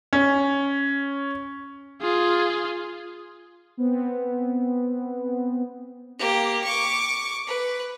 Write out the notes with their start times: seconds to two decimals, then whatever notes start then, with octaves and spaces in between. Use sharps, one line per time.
0.13 C#4
2.01 F4 G#4
3.77 B3 C4
6.19 A#3 G4
6.64 C#6 D6
7.47 B4